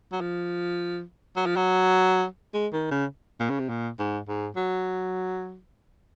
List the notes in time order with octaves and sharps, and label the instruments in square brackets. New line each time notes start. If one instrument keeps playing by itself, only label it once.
[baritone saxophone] F#3
F3
F#3
F3
F#3
G#3
D#3
C#3
A#2
C#3
C3
A#2
G#2
G#2
F#3